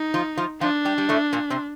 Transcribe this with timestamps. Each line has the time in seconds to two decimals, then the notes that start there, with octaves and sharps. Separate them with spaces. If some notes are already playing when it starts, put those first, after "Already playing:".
Already playing: D#4
0.14 F3 F4
0.38 F3 F4
0.61 F3 D4 F4
0.85 G3 G4
0.98 G3
1.09 A2 A3
1.33 A#2 A#3
1.50 C3 C4